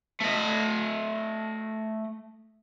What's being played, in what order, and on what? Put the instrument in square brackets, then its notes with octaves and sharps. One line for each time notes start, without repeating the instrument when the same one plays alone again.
[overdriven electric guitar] A3 D#5